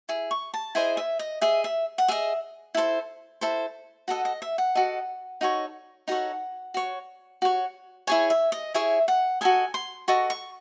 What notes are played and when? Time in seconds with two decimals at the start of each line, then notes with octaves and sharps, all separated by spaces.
0.09 E4 G#4
0.31 C#6
0.54 A5
0.75 E4 G#4 C5 D#5 G#5
0.97 E5
1.19 D#5
1.41 G#4 D#5 E5
1.64 E5
1.98 F#5
2.08 G#4 D#5 E5
2.75 E4 A4 C5
3.41 E4 A4 C5
4.08 F#4 A4 D#5 F#5
4.25 D#5
4.42 E5
4.58 F#5
4.75 F#4 A4 D#5
5.41 D#4 F#4 A4 C#5
6.08 D#4 F#4 A4 C#5 F#5
6.74 F#4 C#5
7.42 F#4 C#5
8.07 E4 G#4 C#5 G#5
8.30 E5
8.52 D#5
8.74 E4 G#4 C#5 E5
9.08 F#5
9.41 F#4 A4 D#5 G#5
9.74 C6
10.08 F#4 A4 D#5 C#6
10.30 C#6